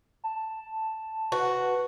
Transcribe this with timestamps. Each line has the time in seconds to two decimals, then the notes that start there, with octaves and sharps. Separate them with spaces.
0.24 A5
1.32 F#4 B4